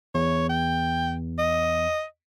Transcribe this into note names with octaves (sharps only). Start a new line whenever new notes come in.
E2 C#5
G5
D#5